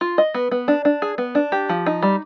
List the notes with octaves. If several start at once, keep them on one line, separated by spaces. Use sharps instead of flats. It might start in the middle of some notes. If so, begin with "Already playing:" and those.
F4
D#5
B3
B3
D4
D4
G#4
B3
D4
G4
F3
D#4
G3